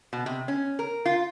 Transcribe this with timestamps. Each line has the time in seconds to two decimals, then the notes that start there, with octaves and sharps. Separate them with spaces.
0.13 B2
0.26 C3
0.48 C#4
0.79 A#4
1.06 F4